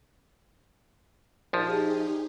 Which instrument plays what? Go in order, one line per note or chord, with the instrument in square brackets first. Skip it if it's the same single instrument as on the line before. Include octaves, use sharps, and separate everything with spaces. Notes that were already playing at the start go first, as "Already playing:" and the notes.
[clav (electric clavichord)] A#1 F3 [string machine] D#4 G4 G#4